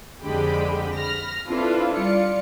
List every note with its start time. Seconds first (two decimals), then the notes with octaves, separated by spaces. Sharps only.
0.23 F2 D3 G#3 G4 B5
0.96 B5 F6 A#6
1.48 C4 D4 E4 F4 A4 B4
1.94 G3 F4 D5 C#7